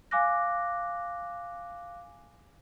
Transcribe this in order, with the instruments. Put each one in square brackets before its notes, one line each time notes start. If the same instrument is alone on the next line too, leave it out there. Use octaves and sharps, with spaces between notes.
[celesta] F5 G#5 D6 F#6 A#6